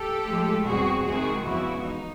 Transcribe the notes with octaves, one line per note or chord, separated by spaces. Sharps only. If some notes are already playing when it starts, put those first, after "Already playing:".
Already playing: G4 A4
A2 F3 G#3
E2 B2 G3 C4 F#4 G#4
C3 D#3 G#3 C4 F#4 G#4
F2 C#3 E3 G#3 B3 E4 F#4
D#4